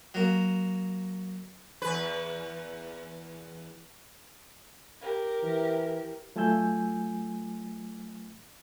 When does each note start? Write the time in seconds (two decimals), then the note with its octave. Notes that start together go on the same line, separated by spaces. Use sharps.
0.14 F#3 A#3
1.82 E2 B4
5.02 G4 A#4
5.43 E3
6.36 F#3 A3 F4 G#5 E6 G6